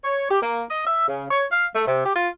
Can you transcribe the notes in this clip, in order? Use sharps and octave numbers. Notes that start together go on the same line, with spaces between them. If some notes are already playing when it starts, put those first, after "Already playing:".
C#5
G4
A#3
D#5
E5
C#3
C#5
F5
A3
C3
G4
F4